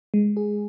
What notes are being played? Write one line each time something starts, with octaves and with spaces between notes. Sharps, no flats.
G#3
G#4